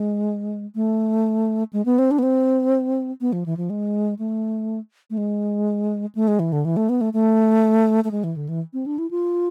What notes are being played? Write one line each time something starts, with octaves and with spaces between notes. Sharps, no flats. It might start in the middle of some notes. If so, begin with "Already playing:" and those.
Already playing: G#3
A3
G#3
B3
C4
D4
B3
C4
B3
F3
E3
F3
G#3
A3
A3
G#3
A3
G#3
E3
D3
E3
A3
B3
A3
A3
A3
G#3
E3
D3
E3
C4
D4
E4
F4